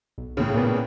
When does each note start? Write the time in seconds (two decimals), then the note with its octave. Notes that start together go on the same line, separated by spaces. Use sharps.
0.18 B1
0.37 A2 C#3
0.54 A#2 B3